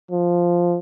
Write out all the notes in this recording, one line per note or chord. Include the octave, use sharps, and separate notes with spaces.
F3